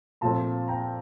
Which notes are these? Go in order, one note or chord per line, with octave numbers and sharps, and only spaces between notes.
A#2 F3 A3 C4 A5 C6
G5 A#5